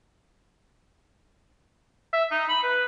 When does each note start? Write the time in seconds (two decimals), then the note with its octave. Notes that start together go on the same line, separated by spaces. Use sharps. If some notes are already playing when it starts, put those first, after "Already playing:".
2.13 E5
2.31 D#4
2.49 B5
2.63 B4